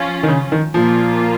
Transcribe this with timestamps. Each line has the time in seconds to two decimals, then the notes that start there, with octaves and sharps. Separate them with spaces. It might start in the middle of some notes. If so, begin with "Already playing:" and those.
Already playing: F3 C#4 F4
0.23 D#3
0.28 C#3
0.52 D#3
0.74 A#2 F3 A#3 F4